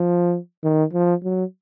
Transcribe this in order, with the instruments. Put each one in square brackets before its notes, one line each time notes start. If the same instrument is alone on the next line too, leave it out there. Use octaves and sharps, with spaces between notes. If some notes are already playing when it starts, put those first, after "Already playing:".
Already playing: [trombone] F3
D#3
F3
F#3